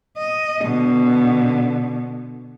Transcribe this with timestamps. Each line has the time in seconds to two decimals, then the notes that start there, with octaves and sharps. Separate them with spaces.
0.17 D#5
0.63 B2 D3